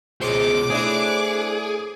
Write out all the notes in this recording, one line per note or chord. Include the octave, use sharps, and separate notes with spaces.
C#2 B2 C5 C#5 G#5 D6
A2 C4 D4 E4 G#4